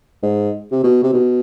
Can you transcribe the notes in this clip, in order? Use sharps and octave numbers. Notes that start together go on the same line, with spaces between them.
G#2
C3
B2
C3
B2